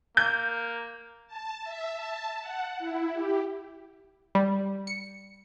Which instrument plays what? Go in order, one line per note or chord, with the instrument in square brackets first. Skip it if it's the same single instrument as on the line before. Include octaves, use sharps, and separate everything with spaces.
[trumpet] A#3 [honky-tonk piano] G6
[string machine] A5
E5
A5
F#5
E4
G4
[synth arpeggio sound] G3
C#7